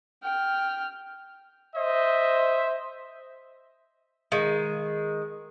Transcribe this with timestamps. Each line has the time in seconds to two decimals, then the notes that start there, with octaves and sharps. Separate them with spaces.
0.23 G5 F6
1.75 C5 D#5 E5
4.32 D#3 G#3